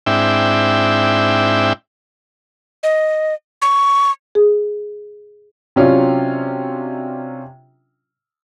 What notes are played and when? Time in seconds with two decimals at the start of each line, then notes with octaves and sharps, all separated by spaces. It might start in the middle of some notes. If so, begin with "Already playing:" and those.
0.06 G#2 C4 D4 E4 E5 G5
2.83 D#5
3.62 C#6
4.35 G#4
5.76 C3 F#3 C#4 D4 F4